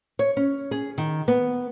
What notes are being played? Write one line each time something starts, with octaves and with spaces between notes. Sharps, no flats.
C#5
C#4
G#4
D#3
B3